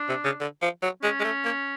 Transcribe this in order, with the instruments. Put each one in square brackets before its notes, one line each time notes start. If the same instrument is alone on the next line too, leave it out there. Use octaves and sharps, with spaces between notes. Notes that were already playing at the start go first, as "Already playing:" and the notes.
Already playing: [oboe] D4
[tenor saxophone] C3
C#3
D3
F3
F#3
[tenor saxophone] G#3 [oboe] C#4
[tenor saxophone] G#3
A3
A#3